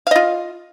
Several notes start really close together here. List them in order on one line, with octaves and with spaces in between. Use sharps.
F5 D#5 F4